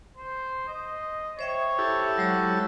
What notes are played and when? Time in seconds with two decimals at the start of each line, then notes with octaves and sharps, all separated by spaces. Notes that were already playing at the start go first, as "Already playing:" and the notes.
0.17 C5
0.68 D#5
1.39 C5 C#5 E5 G5
1.79 E4 G4 A4
2.18 F#3 G#3 F#4 C#5